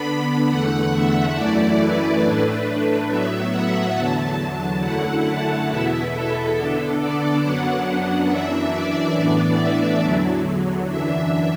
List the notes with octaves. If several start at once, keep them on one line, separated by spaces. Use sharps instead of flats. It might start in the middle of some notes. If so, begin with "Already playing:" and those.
Already playing: D3 B3 D4 B5
E2 D3 A3 F#5
E5
F#2 E3 A3 E4 D5
B4
A2 A3 D4
A2 F#3 B3 E5
F#5
E2 D3 F#3 A5
A5
F#2 D3 A3 E4 F#5
A5
E2 B2 B3 E4 E5
A4
D3 B3 D4
D5
F#2 F#3 B3 D4 F#5
F#5
F#2 E3 D4 E5
D5
A2 E3 B3 D4
E5
E2 D3 F#3
F#2 E3 D4 E5